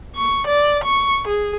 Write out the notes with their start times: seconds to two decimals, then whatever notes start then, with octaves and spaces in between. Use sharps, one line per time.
0.16 C#6
0.47 D5
0.84 C#6
1.28 G#4